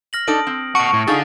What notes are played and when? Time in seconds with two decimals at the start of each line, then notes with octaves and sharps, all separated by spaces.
0.13 F6 A#6 F#7
0.28 D4 D#4 A4 D#6 D7
0.47 C4
0.75 D#5 F#5 A5 C#6 D7
0.93 A2
1.07 D4 D#4 F4 G#4 A4 A6